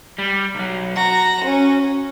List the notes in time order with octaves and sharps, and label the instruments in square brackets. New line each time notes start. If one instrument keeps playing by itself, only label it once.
[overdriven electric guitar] G3
B1 F#3
[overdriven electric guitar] F#4 [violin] A#5
[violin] C#4